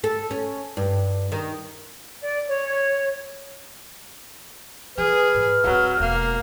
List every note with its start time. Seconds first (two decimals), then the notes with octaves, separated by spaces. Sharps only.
0.04 A4
0.31 C#4
0.77 G2
1.32 D#3
2.21 D5
2.49 C#5
4.98 E3 G#4 B4 F6
5.35 G#2
5.64 D1 F#3 C4
6.00 E1 A#3